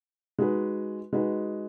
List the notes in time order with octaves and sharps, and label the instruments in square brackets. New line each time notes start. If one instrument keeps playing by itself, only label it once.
[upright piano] G#3 D#4 F#4 B4
G#3 D#4 F#4 B4